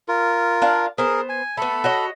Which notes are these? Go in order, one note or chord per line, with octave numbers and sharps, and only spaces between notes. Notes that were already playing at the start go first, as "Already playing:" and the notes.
F4 A#4
D4 F5
B3 G#4 A#4 C5
G#5
A3 B3 A4 B5
F#4 C#5 D#5